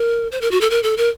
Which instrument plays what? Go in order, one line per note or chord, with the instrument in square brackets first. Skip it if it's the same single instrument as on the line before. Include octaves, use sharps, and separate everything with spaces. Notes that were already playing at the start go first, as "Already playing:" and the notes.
Already playing: [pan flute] A#4
C5
A#4
F#4
A4
A#4
A4
A#4